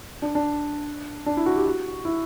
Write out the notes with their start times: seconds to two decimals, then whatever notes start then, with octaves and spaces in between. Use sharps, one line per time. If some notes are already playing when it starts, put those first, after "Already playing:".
0.22 D4
0.35 D4
1.26 D4
1.37 E4
1.46 F#4
1.56 G4
1.66 F#4
2.05 E4